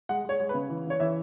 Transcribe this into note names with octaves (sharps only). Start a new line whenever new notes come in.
G#3 F#5
G#3 C#5
G#3
B4
C#3
E3
E3 C#5
E3 E5